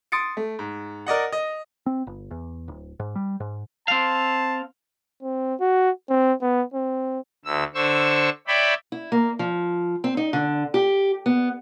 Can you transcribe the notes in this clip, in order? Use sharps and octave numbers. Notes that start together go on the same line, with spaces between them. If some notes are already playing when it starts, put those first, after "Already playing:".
C6 D#6 A6 C#7 D7
A3
G#2
A#4 D5 D#5 F#5
D#5
C4
G1
E2
D1
G#2
G3
G#2
C4 F5 A5
C4
F#4
C4
B3
C4
D2 E6
D3 C5 C#6 E6
C#5 D5 E5 G5 B5
E4
A#3
F3
C4
D#4
D3
G4
B3